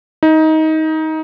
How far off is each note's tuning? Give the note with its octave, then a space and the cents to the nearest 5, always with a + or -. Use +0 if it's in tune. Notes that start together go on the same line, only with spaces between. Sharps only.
D#4 +20